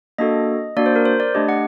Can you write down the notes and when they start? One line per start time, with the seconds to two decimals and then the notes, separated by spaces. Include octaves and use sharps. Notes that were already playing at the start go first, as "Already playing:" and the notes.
0.18 A#3 D4 F#4 A4 D#5
0.76 A#3 D4 F#4 D5
0.86 C5
0.96 A#4
1.05 C5
1.20 D5
1.35 A3 D4 G4 D#5
1.49 F#5